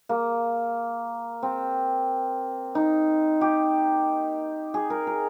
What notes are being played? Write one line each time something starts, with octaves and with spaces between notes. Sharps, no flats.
A#3
C4
D#4
G4
G#4
A#4
A#4